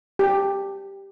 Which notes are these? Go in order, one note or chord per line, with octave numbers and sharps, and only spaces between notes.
G4